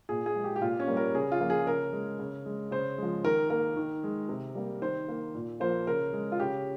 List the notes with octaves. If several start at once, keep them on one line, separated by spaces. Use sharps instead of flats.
A#2 G#4
G#4
G#3
G4
G4
A#2 F4
C#4
G3 A#3
A#4
C#3 G#4
F4
F3 A#3
G#4
C#3 A#4
G#3
C#3
G#3
C#3 C5
F3 G#3
D#3 A#4
A#3 A#4
D#3
G#3
C3
G3 A#3
D#3 C5
A#3
A#2
F3 A#3 C5
C#3 A#4
G#3
F4
C#3 G4